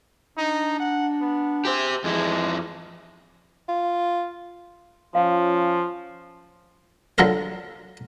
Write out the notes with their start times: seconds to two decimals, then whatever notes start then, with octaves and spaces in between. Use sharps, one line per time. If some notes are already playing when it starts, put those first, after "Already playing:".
0.38 D4 D#4
0.80 F#5
1.21 B3
1.65 G4 G#4 C5 E5 G#5
2.04 F2 E3 G#3 E4
3.68 F4
5.15 F3 C#4 F4 F5
7.18 D3 F3 F#3 A4 A#4 C5